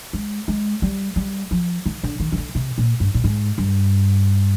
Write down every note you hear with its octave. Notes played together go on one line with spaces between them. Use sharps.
G#3
G#3
G3
G3
F3
D#3
D3
D#3
D#3
D3
C3
A#2
G2
A#2
G#2
G2